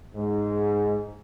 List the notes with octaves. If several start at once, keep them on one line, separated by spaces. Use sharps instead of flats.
G#2